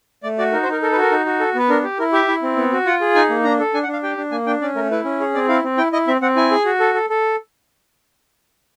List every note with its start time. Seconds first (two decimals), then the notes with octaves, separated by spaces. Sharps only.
0.23 A3 D5
0.38 F#4 D5
0.52 D#4 A#4
0.63 C5
0.68 D#4 A#4
0.82 A4 A#4
0.92 B4
0.97 F#4 A#4
1.11 D#4
1.26 F#4
1.40 A4
1.55 B3 B4
1.69 D4 A#4
1.83 G4
1.99 E4 A#4
2.13 G4 E5
2.28 E4
2.43 C4
2.56 B3
2.72 F#4
2.86 F4 F#5
3.01 G#4
3.15 D#4 G#5
3.29 A#3
3.44 D4 A#5
3.59 A4
3.74 D4 G#5
3.83 F#5
3.88 D4
3.93 F5
4.03 G4 G5
4.17 D4
4.31 A#3 G#5
4.46 D4 G5
4.62 C#4 D5
4.75 A3 A#4
4.91 E4 B4
5.04 C#4
5.20 G#4 C#5
5.34 C4 D5
5.48 E4 F5
5.64 C4
5.77 E4 G5
5.92 E4 D#5
6.07 C4 E5
6.21 C4 F#5
6.36 E4 G#5
6.51 G#4
6.65 F#4
6.80 A4
6.94 A4
7.10 A4